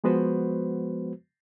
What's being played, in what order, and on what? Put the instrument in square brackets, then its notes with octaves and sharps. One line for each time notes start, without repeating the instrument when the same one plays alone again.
[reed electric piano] F3 G#3 B3 F#4 B4 C5